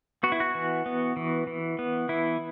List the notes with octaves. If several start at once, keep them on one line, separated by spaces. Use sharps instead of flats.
B3 F#4
E4
F#4
E3
B3
E3
E3
B3
E3 E4